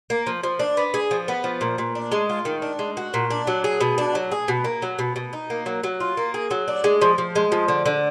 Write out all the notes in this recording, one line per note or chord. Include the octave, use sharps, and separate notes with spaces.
A#3
F3
F3
D4
B3
G#4
F3
B3
F3
A#2
A#2
D4
G#3
F4
D#3
D4
G#3
F#4
A#2
D4
F#3
G#4
B2
D4
F#3
G#4
B2
A#3
F#3
B2
B2
D#4
A#3
F#3
F#3
F4
A#3
G#4
F#3
D4
G#3
F3
F3
G#3
F3
D3
D3